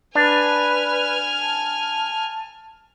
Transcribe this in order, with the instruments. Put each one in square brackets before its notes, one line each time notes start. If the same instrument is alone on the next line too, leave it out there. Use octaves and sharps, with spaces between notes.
[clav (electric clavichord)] D4 [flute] B4 [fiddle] G#5 F6
[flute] A5